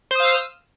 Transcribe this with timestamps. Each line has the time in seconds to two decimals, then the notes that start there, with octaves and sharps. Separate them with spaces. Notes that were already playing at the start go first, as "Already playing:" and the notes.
0.11 C5
0.15 D#6
0.20 F5
0.24 E6